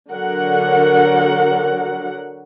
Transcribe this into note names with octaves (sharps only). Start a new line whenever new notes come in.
D3 F#3 A#4 F#5